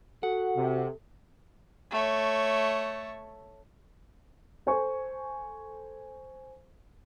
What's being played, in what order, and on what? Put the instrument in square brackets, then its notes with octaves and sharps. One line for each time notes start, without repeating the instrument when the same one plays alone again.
[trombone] F#4 [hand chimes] A4 [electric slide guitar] F#5
[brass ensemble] C3
[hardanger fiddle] A3 C#5
[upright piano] A4 C5 G#5 C#6